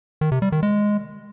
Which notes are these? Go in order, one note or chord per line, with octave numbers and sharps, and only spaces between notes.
D#3
C3
G3
D#3
G#3